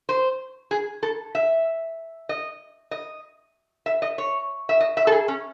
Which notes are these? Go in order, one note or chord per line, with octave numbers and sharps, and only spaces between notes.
C5
G#4
A4
E5
D#5
D#5
E5
D#5
C#5
E5
D#5
E5
A4
G#4
C#4